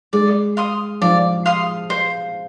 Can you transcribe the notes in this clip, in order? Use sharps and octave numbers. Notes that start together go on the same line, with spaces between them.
G#3 D5
F5 C6 D#6
F3 D5
F5 C6 D#6
C5